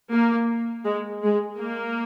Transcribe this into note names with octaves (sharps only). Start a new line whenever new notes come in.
A#3
G#3
G#3
A#3